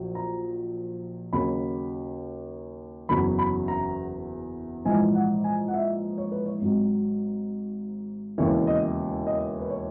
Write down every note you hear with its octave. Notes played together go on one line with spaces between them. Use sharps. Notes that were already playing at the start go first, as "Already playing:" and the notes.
Already playing: A#1 A#2 F#3
A#5
D#2 C#3 F#3 B5
F#1 E2 C#3 F#3 B5
B5
A#5
A#1 G#2 E3 G#5
F#5
G#5
F#5
E5
C#5
B4
C#5
G#1 G#2 F#3
E1 D#2 C#3 E3 C#5
D#5
D#5
B4
C#5